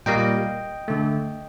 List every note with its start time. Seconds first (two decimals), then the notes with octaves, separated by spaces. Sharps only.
0.06 A#2 G3 A#3 D#5 G5
0.88 D3 A3